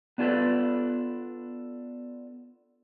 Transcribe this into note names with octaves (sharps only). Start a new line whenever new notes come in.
B3 D4 F4 G#4 A4 B4